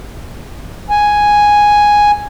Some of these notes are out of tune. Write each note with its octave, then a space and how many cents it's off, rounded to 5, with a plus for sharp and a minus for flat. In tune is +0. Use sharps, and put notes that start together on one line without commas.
G#5 +0